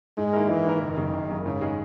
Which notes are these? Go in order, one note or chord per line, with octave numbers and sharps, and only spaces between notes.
G#2 G#3
D#3 A#3 E4 A#4
G#2 E3
D#3 A#3 E4 A#4
F#1 D#3
F#2 C#3
F#1
F#2 C#3
G#2 C#3
D#3 G#3 D#4 G#4